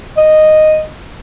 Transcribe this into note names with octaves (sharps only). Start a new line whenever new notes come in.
D#5